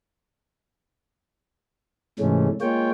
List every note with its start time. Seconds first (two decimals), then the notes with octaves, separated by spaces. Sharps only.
2.19 G#2 C3 E3 G#3 A3 C#4
2.61 G#3 A#3 F4 C#5 G5